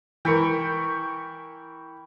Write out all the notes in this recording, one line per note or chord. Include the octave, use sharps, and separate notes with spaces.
E3 A#4 G5 B5 C#6